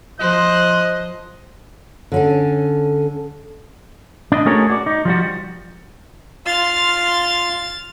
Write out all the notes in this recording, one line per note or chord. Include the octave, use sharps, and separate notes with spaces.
F3 C5 D#5 F#6
D3 C#4 A4
D4 D#5
A3 C#4 F#4 G#4 A#4 C#5
F#4 D5
D#4
F3 G3 F#4
F4 C6 F6 A6